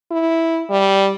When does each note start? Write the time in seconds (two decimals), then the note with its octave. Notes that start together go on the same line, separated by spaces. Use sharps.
0.11 E4
0.70 G3